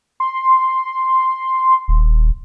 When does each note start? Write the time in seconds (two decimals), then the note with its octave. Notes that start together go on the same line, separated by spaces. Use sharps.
0.20 C6
1.88 D#1